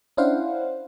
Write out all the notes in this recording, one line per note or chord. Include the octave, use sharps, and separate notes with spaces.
C#4 D4 E4 C5 F5 F#5